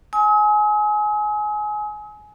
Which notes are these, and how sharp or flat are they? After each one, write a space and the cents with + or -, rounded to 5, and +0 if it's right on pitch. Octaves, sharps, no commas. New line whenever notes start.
G#5 +20 D#6 +45